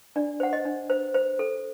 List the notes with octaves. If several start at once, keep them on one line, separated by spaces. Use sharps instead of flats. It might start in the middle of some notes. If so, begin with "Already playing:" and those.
D4 D5
C5 F#5
D#5
D4
C5
C5
A4